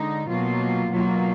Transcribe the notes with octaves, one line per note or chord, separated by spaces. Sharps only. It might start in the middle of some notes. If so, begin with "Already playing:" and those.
Already playing: D3 G#3 D#4
B2 F#3 A#3 F4
B2 F#3 A#3 F4